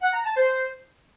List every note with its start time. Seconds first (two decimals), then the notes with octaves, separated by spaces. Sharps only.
0.02 F#5
0.13 A#5
0.24 A5
0.36 C5